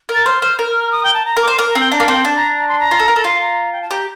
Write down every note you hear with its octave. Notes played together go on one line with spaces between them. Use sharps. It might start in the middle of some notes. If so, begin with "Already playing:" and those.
A#4
A6
C5 F6
C5
A#4
D#6
G5
A5
A#5
A#4
D6
C5
A#4
A#5
C4 G5
D4 A#5
A#3
C4 G5
D4 A5
A#5
A#5
C6
A#5
F4
A4
A#4
A4
F4 C6
A#5
G5
A5
G4 A#5